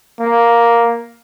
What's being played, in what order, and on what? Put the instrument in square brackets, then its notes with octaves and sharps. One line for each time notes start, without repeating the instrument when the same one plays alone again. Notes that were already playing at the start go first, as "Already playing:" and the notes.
[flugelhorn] A#3